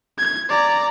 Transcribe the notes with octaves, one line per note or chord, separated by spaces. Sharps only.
G#6
D5 A#5